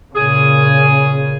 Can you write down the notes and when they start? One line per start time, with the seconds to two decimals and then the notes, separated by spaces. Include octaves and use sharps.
0.15 A#2 C#3 G#4